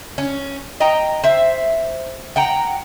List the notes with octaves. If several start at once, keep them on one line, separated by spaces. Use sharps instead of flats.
C#4
D#5 G5 A#5
C5 E5
F#5 G5 A#5